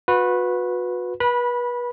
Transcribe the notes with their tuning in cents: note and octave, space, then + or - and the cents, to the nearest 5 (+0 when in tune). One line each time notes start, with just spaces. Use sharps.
F#4 -35 B4 +0
B4 -30 B5 -15